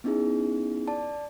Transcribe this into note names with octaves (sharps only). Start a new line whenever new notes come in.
B3 C#4 D#4 E4 G#4
D5 A5